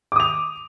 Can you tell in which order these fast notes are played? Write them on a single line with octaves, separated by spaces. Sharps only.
D6 D#6 F7